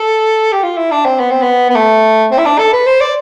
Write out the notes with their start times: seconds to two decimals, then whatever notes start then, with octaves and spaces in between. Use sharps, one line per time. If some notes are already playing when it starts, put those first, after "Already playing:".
Already playing: A4
0.52 G4
0.63 F4
0.77 E4
0.91 D4
1.06 C4
1.19 B3
1.31 C4
1.42 B3
1.70 B3
1.75 A3
2.31 C4
2.38 E4
2.45 D4
2.59 A4
2.73 B4
2.87 C5
3.01 D5